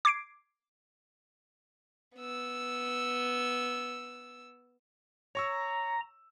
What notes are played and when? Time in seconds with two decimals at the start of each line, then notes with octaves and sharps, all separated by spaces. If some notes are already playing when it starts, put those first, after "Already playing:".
0.05 D6 G#6 C7 D7
2.17 B3 E6
5.35 C#5 A#5 C#6 E6